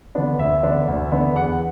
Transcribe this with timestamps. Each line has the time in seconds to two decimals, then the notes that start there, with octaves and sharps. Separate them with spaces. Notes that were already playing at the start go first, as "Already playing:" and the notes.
0.15 D3 B3 D4
0.39 D2 E5
0.63 D3 B3 D4
0.88 D2
1.12 D3 B3 D4
1.35 E2 F#5